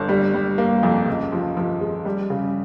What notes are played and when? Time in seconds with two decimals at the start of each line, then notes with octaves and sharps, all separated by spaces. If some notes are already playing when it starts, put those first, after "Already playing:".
Already playing: G1
0.09 G3
0.34 G3
0.58 A#3
0.83 F2
1.07 C#2
1.32 F3
1.57 F3
1.81 G#3
2.05 G3
2.30 C#3